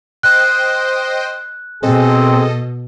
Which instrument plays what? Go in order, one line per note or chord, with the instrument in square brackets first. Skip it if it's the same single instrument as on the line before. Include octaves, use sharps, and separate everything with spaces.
[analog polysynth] C5 D#5 G5 [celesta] F#6
[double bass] B2 [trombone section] C4 G#4 [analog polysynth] A4 D#5